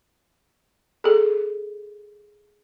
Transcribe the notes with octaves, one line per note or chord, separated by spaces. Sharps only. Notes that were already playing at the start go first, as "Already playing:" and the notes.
G#4 A4